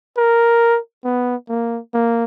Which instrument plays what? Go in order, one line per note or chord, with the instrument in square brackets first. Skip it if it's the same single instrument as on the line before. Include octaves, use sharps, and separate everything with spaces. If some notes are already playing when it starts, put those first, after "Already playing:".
[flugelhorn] A#4
B3
A#3
A#3